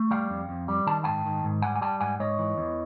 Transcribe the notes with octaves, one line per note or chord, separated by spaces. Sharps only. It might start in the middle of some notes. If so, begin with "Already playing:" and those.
Already playing: A3
G3 F5 G5
F2
F2
G3
D#3 A5
G#2 G5 A5
D#3
G#2
G3 F#5 G#5
G#5
G3 G5 A5
G#2 F#5 G#5
G#2 C#5 D#5
E3
E2